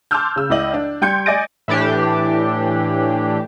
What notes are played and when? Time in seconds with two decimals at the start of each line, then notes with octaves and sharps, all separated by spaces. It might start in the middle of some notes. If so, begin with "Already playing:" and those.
0.11 A5 C6 D6 E6 F6 G6
0.36 C#3 E6
0.50 C#2 E4 D5 D#5 F#7
0.74 D4
1.02 G3 G5 C6 G6 G#6 C#7
1.26 D5 D#5 G#5 A6 A#6 D7
1.68 A2 E3 D4 G4